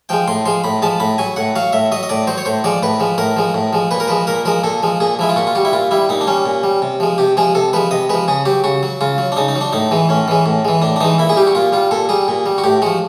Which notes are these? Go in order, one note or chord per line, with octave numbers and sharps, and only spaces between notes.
F3 G#3 G5
A2 C6
F3 G#3 C6
A2 B5
F3 G#3 A5
A2 B5
F#3 G#5
A2 F#5
F#3 F5
A2 E5
F#3 D#5
D#5
A2 D5
F#3 C5
C#5
A2 C5
F3 G#3 D5
A2 B4
F3 G#3
A2 A#4
F3 G#3
A2
F3 G#3
A#2 B4
A#4
F3 G#3 B4
A#2 A#4
F3 G#3 A#4
A#2 A4
F3 G#3
A#2 G#4
F3 G#3 E4
F4
A#2 F#4
F4
G3 F#4
E4
A#2 F4
G3 E4
A#2 D#4
D4
G3 C#4
A#2
G3
C3
F3 G#3
C3 G4
F3 G#3 G#4
C3 A4
F3 G#3 B4
C3 D#5
F3 G#3 B4
C#3 G#4
F#3 G4
C#3 F#4
F#3
C#3 F4
F#3
D4
C#3 D#4
D#4
F#3
D4
A2 D#4
E3 G#3
A2 C#4
E3 G#3
A2
E3 G#3
A2 D4
D4
E3 G#3 D#4
A#2 E4
G#4
G3 G4
F#4
A#2 F4
G3 F4
A#2 A4
G3 G#4
A#2
G3
F#4
A2 G4
F3 G#3 F#4